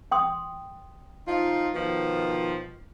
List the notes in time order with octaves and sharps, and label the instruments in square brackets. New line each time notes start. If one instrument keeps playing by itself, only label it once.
[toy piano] G5 C6 D#6
[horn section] F3 D#4 F4
B2 D#3 F3